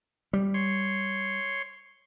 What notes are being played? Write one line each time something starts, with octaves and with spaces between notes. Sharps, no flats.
G3
C#5 C6